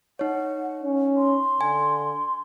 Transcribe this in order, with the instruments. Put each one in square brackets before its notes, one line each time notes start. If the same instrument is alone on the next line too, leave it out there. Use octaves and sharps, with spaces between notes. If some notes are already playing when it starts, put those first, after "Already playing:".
[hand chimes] D#4 C#5 [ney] F#5
[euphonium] C#4
[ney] C6
[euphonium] D3 [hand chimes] G#5